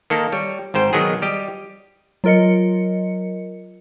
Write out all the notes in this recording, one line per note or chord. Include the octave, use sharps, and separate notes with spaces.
D#3 A#3 A4
G3 C#5
G#1 G#2 C5 G5
B2 D#3 F#3 G#4
G3 G4 D#5
F#3 F4 A#4 D#5 C#7